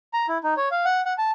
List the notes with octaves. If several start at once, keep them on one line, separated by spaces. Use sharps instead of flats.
A#5
E4
D#4
C#5
F5
F#5
F#5
A5